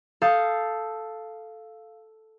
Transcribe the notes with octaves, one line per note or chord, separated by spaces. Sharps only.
A4 F5 D#6 G6